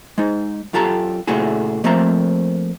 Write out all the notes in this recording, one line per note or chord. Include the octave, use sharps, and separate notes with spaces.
G#3 D#4
F#2 F4 G4 A4 A#5
A#2 C#3 A3 E4 F#4 G#4
F3 A3 A#3 C4 E5 A#5